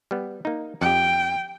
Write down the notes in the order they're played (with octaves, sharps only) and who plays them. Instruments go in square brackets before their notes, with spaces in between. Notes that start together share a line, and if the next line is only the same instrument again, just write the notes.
[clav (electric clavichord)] G3 B3
A#3 D#4
[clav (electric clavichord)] F2 G4 [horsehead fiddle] G5